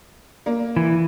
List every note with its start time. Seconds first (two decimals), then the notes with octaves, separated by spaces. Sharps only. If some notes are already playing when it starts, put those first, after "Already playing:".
0.46 A#3
0.76 E3